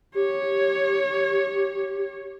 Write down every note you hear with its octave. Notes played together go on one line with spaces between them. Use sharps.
G4 C#5